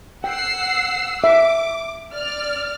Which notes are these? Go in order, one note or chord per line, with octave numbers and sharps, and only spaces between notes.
F#5 G5 E6 C7
E5 D6
D5 F6